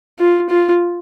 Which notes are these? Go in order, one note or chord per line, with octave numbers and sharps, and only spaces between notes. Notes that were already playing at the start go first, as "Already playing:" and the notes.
F4
F4